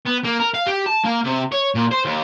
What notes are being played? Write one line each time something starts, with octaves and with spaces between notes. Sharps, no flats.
B3
A#3
A#4
F5
G4
A5
A#3
C3
C#5
A#2
C5
D#2